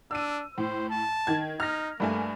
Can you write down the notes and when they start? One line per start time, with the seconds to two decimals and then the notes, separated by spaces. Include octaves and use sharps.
0.11 D4 E6 D#7
0.58 A2 C5
0.90 A5
1.27 D#3 G#6
1.60 D#4 F6 A#6
2.00 G2 A3 A#3 G#5